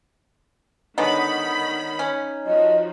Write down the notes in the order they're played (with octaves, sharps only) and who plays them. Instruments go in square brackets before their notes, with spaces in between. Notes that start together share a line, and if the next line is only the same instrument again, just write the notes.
[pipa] D3 G#3 B3 [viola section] D#3 B5 [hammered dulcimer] D#4 C#5
[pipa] C#4
[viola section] F3 F#4 [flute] D#5